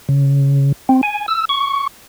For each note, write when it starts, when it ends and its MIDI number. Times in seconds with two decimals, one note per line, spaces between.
0.09 0.72 49
0.89 1.01 60
1.03 1.26 80
1.28 1.45 88
1.49 1.87 85